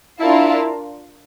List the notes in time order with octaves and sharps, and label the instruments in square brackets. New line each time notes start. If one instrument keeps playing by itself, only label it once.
[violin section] D4 F4 A#4 F5 A5 [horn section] E4